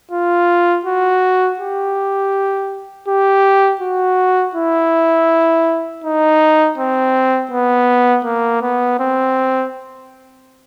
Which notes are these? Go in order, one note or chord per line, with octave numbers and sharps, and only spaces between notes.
F4
F#4
G4
G4
F#4
E4
D#4
C4
B3
A#3
B3
C4